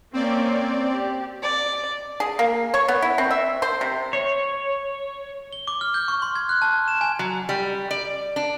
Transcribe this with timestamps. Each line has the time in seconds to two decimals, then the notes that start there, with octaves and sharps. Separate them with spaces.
0.13 A#3 C4 C#4 D5
0.92 G4
1.43 D5
2.20 G#4
2.39 A#3
2.74 C#5
2.88 B3
3.02 E4
3.18 C4
3.31 E5
3.62 C5
3.81 C3
4.13 C#5
5.53 G7
5.67 D6
5.81 F6
5.94 G6
6.08 C#6
6.22 C6
6.35 G#6
6.49 F#6
6.62 A5
6.88 E7
7.01 G#5
7.19 F#3
7.49 G3
7.91 D5
8.36 D4